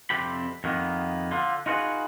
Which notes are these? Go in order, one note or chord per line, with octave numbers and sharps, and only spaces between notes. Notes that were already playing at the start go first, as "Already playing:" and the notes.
F2 C3 C4 D4 G4 B5
F2 D#3 A#3 B3
D3 F4
D#4 F4 F#4 G#4 B4